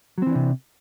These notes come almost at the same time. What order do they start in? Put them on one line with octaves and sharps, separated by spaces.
F#3 C4 E3 D4 C3